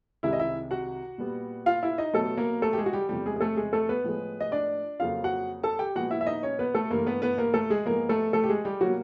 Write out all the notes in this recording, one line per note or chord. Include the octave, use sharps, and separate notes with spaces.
C2 C3 D#3 G#3 E4 E5
D#5
E4 E5
F#4 F#5
A#2 G3 B3
F4 F5
E4 E5
D#4 D#5
B2 F#3 A3 B3 A4
A#3 A#4
A3 A4
G4
G#3 G#4
F#4
G3 G4
E2 C3 F3 G3 A3 G4
G#3 G#4
G#4
A3 A4
G#3 G#4
A3 A4
B3 B4
A2 F3 G#3 B3
D#5
D4 D5
F2 C#3 F#3 A#3 F4 F5
F#4 F#5
A4 A5
G4 G5
A#2 F3 G#3 B3 F#4 F#5
E4 E5
E5
D#4 D#5
C#4 C#5
B3 B4
A3 A4
G2 E3 A3 A#3 A#4
B3 B4
B3 B4
A#3 A#4
A3 A4
G#3 G#4
G#2 F3 G#3 A#3 B3 A#4
A3 A4
A3 A4
G4
G#3 G#4
G3 G4
B2 F#3 G3 A#3 F#4